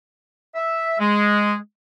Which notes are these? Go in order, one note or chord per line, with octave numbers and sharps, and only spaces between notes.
E5
G#3